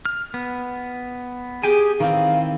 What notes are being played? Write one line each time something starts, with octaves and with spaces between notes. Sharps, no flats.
F6
B3
G4 G#4 G5 G#5
D#3 E3 C4 F5